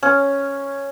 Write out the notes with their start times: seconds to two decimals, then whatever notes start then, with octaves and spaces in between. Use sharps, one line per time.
0.03 C#4